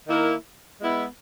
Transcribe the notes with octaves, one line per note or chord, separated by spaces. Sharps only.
D#3 A#3 E4 A#4
G#3 B3 E4